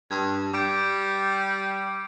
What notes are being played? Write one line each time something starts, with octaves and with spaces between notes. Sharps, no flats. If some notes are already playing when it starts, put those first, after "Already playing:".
G2 G#6
G3 D6 G6 D7